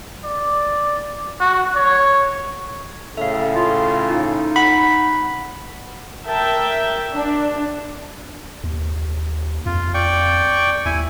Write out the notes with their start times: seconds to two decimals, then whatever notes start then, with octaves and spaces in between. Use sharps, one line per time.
0.24 D5
1.40 F#4
1.76 C#5
3.17 A2 C#3 A4 E5 F5
3.55 F4
4.10 D#4
4.56 F#5 B5
6.25 A#4 E5 G5 A5
7.15 D4
8.64 D#2
9.66 F2 F4
9.94 D5 G5 C#6
10.86 D#2 E4 G#5